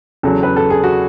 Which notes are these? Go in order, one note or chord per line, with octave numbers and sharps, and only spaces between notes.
E2 C#3 F#3 A4
B4
A4
G#4
F#4